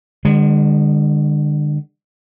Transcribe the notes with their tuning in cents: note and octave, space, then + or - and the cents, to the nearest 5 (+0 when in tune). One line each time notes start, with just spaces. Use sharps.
D3 +30 G#3 -35